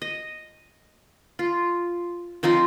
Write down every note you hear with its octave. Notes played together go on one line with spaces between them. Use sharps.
D#5
F4
F3 C4 D#4 F4